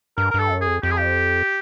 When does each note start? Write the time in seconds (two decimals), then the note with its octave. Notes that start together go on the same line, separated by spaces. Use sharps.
0.17 G2 A#4
0.31 A#4
0.34 G2
0.39 A4
0.50 F#2
0.61 G#4
0.67 F2
0.83 F2 G4
0.91 G#4
0.97 G4